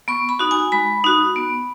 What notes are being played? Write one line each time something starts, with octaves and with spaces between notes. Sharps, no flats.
B3 C#6
B5
D#4 F#4
G#5
G#3 B5
D#4 F#4
B3